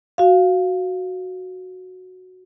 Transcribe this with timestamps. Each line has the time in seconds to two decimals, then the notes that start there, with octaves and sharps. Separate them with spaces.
0.18 F#4 F5